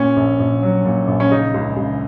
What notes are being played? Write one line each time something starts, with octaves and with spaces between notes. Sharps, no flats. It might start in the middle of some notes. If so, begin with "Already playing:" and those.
Already playing: A#2 C#4
A#1
A#1
F#3
A#2
A#1
C#4
C#3 D#4
C#2
C#2